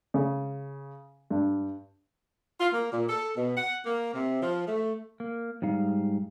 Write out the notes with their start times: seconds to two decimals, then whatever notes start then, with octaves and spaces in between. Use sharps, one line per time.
0.14 C#3
1.30 G2
2.60 F4
2.74 A#3
2.92 A#2
3.09 A4
3.37 B2
3.57 F#5
3.86 A#3
4.14 C3
4.42 F3
4.68 A3
5.20 A#3
5.62 G#2 G3 D#4 F5